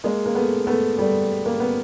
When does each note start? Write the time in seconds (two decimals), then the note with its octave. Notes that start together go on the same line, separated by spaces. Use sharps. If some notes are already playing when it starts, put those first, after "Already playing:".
0.04 G#3 A#3
0.26 A#3
0.35 A3 B3
0.67 A3 B3
0.98 G3 A3
1.46 A#3
1.60 B3